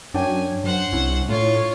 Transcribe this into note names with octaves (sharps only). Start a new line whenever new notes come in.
F#2 D4 C#5 G5 G#5
F#2 C5 F#5
C2 C#4 E4
A2 F4 C#5